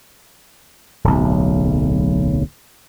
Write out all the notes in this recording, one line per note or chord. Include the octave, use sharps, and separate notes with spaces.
D1 B1